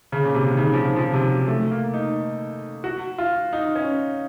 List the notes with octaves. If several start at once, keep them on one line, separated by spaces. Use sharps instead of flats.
C#3
A#2
C3
D#3
C#3
F3
D#3
F3
C3
F#3
A3
A#3
D#4
F#4
F4
D#4
C#4